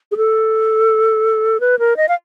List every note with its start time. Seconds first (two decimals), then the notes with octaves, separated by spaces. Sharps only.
0.12 G#4
0.17 A4
1.60 B4
1.79 A#4
1.97 D#5
2.09 F5